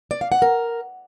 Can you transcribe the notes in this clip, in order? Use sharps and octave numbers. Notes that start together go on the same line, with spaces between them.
D5
F5
F#5
A#4